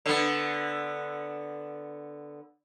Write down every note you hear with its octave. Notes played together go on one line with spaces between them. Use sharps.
D3 B3